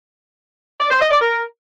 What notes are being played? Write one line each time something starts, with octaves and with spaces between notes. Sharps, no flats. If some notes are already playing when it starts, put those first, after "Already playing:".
D5
C5
D#5
D5
A#4